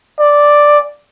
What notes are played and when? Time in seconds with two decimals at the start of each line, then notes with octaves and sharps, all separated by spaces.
0.20 D5